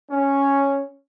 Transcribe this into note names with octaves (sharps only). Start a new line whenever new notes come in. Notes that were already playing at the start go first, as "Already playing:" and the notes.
C#4